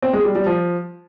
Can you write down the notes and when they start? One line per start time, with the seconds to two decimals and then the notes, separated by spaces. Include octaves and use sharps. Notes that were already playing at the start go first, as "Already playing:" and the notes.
0.02 C4
0.13 G#3
0.24 G3
0.35 G3
0.46 F3